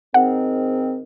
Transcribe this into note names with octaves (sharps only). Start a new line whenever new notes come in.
G#2 D#3 C4 F#5